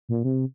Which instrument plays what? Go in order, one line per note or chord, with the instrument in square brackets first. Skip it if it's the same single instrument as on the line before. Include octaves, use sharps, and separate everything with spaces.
[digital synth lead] A#2
C3